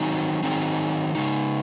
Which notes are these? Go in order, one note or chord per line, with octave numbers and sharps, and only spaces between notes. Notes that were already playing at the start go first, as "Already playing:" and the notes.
Already playing: D#3 F#3 C4 D#4
D#3 F#3 C4 D#4
C#3 G#3 D#4